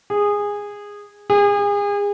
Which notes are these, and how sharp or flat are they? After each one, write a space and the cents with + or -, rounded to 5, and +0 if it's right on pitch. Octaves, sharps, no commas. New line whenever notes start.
G#4 -15
G#4 -35